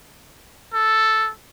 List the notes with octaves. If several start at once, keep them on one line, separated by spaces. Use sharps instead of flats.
A4